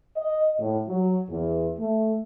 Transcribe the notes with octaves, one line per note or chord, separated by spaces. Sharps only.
D#5
A2
F#3
E2
A3